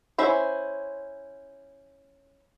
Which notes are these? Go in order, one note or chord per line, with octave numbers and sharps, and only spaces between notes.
C#4 E4 C5